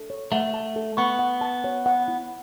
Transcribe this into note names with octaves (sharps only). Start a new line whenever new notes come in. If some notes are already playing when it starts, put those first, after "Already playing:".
Already playing: A4
C#5
A3 F#5
A5
A4
B3 C#6
F#5
A5
C#5
F#5
E4